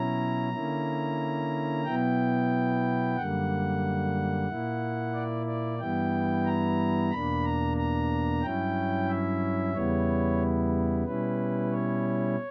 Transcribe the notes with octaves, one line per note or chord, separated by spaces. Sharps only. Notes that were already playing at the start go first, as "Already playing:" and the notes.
Already playing: B2 F#3 C#4 E4 A#5
D3 A#3 C#4 E4
B2 F#3 B3 E4 G5
F#2 D3 G3 A#3 F#5
A#2 A#3 E4
D5
D5
G2 E3 G3 B3 E4 G5
A#5
E2 B2 A#3 D4 B5
A#5
A#5
G2 F#3 C#4 E4 G5
E5
E2 C#3 G3 B3 E4 C#5
B2 G3 C#4 E4 B4
C#5